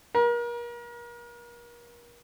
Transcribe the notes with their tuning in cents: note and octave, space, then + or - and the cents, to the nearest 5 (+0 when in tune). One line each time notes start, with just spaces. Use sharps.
A#4 +35